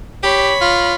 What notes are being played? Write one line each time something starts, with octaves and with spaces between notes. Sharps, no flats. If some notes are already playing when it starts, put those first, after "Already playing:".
G4 C#5 B5
F4